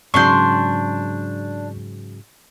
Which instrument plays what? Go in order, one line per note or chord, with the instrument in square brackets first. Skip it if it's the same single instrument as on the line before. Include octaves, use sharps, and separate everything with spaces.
[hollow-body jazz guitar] G#2 C#3 F#3 [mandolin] D4 C6 [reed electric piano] C#6 G6